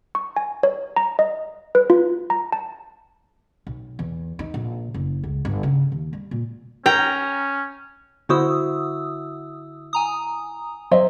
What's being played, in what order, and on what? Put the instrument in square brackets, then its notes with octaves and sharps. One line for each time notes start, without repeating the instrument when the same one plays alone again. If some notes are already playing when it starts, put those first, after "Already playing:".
[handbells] C#6
G#5
C#5
A#5
D#5
B4
F4
A#5
A5
[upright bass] B1
E2
D#4
A#1
F#1
C#2
G1
C#3
D#2
G3
A#2
[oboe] C#4 [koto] G5 A#5
[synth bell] D3 D#6 E6 [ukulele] E4 F#4 C5
[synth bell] G#5 A#5 D#6
[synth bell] F#3 [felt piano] C5 [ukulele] D#5 E5